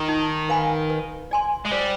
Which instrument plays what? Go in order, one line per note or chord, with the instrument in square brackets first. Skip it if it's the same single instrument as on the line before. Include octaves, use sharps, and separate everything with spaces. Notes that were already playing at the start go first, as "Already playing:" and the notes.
Already playing: [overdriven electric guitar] D#3
[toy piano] D#4
B4 F5 G#5 B5
B4
D5 G#5 C6
[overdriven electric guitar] G#3
[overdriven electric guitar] G3 [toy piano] C5